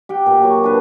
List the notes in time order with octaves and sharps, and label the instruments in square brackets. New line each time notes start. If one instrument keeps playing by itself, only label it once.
[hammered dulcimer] G4 F#5 G5
A#2
A#2 F#3 C#5
D4 B4